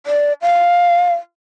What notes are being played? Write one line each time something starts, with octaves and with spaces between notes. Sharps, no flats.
D5
F5